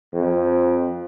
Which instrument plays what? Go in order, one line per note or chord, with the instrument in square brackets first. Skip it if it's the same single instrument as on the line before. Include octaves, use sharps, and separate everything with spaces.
[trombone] F2